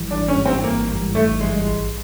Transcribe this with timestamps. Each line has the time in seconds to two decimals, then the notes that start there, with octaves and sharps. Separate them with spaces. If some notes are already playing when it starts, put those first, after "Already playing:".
Already playing: G#1 G#2 E3 G3
0.10 G#1 D4
0.28 C#4
0.37 G#2 E3 G3
0.46 C4
0.63 G#1 A#3
0.90 G#2 E3 G3
1.15 G#1 A3
1.41 G#2 E3 G3 G#3
1.67 A#1